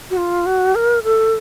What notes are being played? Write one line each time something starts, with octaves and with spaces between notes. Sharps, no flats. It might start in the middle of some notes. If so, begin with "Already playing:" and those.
F#4
F4
F#4
A#4
A4